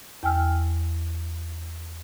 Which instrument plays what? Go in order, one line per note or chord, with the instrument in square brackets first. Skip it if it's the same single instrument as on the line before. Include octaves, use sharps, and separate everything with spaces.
[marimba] E2 G5 G#5 E6 F6